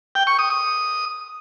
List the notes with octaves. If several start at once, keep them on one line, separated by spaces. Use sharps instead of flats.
G5
C#6
D#6
D#6